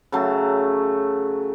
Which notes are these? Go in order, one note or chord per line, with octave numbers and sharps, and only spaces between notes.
C#3 F#3 A3